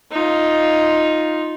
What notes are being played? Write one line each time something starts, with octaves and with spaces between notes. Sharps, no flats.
D#4 F4